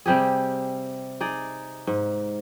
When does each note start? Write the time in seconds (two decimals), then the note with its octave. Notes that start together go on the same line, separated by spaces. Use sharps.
0.06 C3 G3 G4 G#4
1.21 D#4 G#4 D5
1.87 G#2